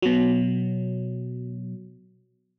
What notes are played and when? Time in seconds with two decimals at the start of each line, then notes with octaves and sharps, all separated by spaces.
0.02 B2 F#3